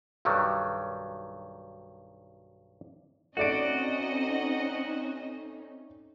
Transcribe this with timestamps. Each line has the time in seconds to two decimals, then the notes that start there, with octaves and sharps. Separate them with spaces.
0.25 B1 G2 D#3 F#3 G3
3.37 A3 C4 C#4 D#4 F#4 D5 D#5 D7